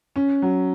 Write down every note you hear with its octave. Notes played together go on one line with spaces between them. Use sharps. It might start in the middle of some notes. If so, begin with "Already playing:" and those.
C#4
F#3